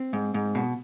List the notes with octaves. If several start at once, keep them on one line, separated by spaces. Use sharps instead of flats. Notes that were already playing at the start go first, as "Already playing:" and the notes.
Already playing: C4
G#2
G#2
B2